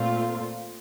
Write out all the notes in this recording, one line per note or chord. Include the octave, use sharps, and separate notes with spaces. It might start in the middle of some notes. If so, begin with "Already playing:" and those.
Already playing: A#2 A3 C4 F4